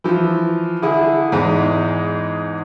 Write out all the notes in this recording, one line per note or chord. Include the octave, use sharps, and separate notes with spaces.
E3 F3
D3 E4 G#4
E2 G#2 G#3